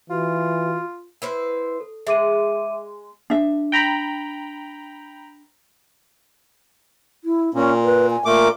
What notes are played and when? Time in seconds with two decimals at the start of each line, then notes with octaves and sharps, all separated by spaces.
0.10 E3 F4 F#4
1.22 E4 B4 C5
1.80 A4
2.07 G#3 E5 D6 D#7
3.30 D4 E5
3.72 G5 A#5 B5
7.24 E4
7.54 A#2 C#4
7.84 B4
8.10 G#5
8.25 A#2 A3 A#4 D6